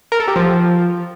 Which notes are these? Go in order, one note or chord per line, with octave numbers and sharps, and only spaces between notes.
A#4
A4
G4
F3